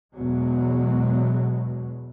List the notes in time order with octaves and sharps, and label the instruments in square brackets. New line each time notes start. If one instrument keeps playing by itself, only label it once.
[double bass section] E2 B2 F#3 G#3